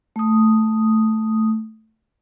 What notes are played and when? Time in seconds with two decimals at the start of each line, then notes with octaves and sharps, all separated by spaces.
0.16 A3 D#6